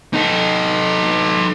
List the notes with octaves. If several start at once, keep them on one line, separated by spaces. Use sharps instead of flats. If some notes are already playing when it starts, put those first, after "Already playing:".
D#4 A4